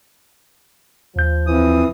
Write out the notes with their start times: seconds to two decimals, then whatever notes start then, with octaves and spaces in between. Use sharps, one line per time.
1.16 D#2 F3 G6
1.47 F2 E3 D#6